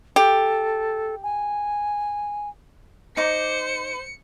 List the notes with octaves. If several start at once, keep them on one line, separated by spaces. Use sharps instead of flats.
G4 A4
G#5
D#4 C5 D6 C#7